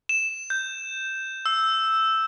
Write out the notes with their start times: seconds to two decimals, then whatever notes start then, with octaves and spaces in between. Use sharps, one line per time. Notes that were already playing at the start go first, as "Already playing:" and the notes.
0.09 E7
0.50 G6
1.46 E6